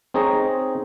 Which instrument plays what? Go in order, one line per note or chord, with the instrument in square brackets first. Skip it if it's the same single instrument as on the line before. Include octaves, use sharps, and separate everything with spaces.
[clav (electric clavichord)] C4 D#4 G#4 C#5 A#5